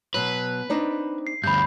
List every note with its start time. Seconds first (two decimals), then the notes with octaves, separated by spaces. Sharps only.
0.14 B2 F#3 B4
0.70 C4 D4 D#4
1.27 C7
1.44 D2 G2 B5 G6